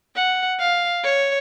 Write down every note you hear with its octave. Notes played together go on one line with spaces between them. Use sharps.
F#5
F5
C#5